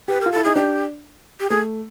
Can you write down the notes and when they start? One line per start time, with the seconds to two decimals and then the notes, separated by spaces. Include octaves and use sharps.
0.08 G4 B4
0.21 F4 A#4
0.32 E4 A4
0.44 D#4 G#4
0.55 D4 G4
1.40 G4
1.50 A3 G#4